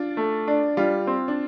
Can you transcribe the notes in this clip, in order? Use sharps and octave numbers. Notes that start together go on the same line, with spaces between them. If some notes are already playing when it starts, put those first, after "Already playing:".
Already playing: D4 F4
A3
D4
G3 F4
C4
D4